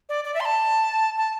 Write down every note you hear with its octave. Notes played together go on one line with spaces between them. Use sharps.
D5
D5
E5
C6
A5
A5